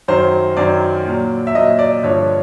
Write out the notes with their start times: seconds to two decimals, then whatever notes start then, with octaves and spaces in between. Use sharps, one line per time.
0.08 F#2 D#3 F#3 C5
0.57 F#2 D#3 F#3 D5
1.06 A#2 F#3
1.47 E5
1.55 A#2 F#3 D#5
1.79 D5
2.03 G2 D3 F3 C#5